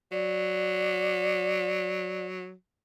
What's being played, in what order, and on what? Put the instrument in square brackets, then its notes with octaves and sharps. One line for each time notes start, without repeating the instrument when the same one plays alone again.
[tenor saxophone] F#3 [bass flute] D5